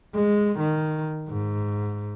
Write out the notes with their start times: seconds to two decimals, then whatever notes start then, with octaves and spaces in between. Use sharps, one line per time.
0.15 G#3
0.59 D#3
1.29 G#2